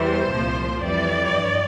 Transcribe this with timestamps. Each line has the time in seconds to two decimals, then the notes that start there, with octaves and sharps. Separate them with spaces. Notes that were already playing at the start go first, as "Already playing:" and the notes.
Already playing: E2 E3 G3 C5
0.30 C2 A#2 F3
0.82 F2 E3 G3 D5
1.35 G2